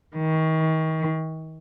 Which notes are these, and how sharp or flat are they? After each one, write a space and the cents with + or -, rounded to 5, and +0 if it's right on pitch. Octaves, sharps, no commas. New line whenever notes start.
D#3 +35